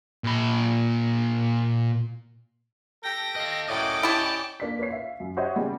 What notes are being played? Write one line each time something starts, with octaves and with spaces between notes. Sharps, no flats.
A#2 B5
G4 A4 G5 A#6
D#5 F5
F#2 A2 D5 D#5 G5 D6
C#4 E4 G4 A5
A#3 D4 B6
A#3 B4 C#5 C7
E5 F5
F#2
F#4 G4 C5 C#5 D#5 E5
C#3 G3 B3 G#4